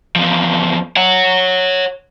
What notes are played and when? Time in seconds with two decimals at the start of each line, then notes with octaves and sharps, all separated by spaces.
0.16 E2 F3
0.97 C#5 F#5